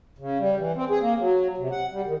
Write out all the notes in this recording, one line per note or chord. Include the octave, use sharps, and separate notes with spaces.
C#3
G3
E3
C4
G#4
A#3
F#3
C3
F#5
G3
D#3